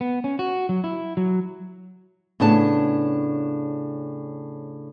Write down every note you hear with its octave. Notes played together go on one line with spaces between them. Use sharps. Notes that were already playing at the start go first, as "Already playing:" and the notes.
B3
C#4
F#4
F#3
E4
F#3
A2 C#3 B3 D4 G#4 A5